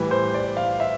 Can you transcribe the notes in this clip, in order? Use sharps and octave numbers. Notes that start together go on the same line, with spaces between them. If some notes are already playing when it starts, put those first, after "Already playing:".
Already playing: A2 E3 G3 B4
C5
D5
F5
E5